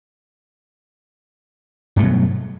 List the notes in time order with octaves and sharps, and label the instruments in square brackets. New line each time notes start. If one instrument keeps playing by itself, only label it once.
[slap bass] G2
A3
B2
F#3